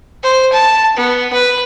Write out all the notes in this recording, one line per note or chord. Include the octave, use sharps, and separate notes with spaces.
C5
A5
B3
B4